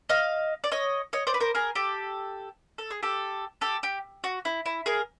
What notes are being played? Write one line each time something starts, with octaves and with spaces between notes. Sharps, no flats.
D#5 F5
D5
C#5 D#5
C#5 D#5
C5 D5
B4
A#4 C5
G#4 A#4
G4 A4
A4
G#4
G4 A4
G4 A4
G4
F#4
E4
E4
G#4 A#4